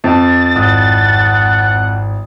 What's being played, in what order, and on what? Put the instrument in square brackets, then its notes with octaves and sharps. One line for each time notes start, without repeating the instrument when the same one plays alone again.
[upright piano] F2 [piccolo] A6
[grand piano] G#1 E4 D#6 [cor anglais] F#5